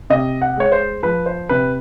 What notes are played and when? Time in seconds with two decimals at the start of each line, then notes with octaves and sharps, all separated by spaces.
0.10 C3 D#5
0.42 F#5
0.57 G#3 C#5
0.72 C5
1.03 F3 B4
1.26 C5
1.49 C3 B4